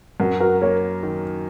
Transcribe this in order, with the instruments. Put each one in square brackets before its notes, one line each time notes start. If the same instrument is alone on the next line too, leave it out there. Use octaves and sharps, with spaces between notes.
[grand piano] F#2 [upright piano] F#4 A#4
[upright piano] F#4 A#4
[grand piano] A#3 [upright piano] A#4 C#5
[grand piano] D#3